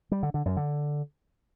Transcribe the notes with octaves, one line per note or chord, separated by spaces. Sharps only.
G3
D3
D3
F#2
D3